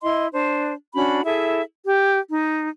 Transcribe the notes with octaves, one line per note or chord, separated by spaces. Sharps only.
E4 D#5 C6
D4 C5
C#4 D4 F#4 B5
E4 G#4 A4 E5
G4
D#4